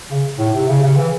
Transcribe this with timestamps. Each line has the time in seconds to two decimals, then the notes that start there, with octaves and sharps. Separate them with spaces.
0.11 C#3
0.39 A2
0.53 C3
0.68 C#3
0.83 C#3
0.97 E3